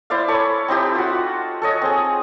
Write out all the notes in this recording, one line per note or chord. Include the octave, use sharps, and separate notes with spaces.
E4 C5 D5 F5
A4 C#5 B5
C4 D#4 E4 G4
F4 F#4
A4 C#5 D#5
C4 G#4